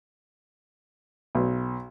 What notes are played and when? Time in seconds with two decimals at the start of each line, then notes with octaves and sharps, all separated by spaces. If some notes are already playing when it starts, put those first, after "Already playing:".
1.35 B1